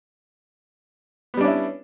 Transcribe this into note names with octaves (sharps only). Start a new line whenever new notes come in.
G3 B3 C#4 D4 E4